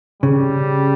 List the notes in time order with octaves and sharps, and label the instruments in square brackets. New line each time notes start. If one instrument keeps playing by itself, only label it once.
[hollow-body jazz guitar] C#3 [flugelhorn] G3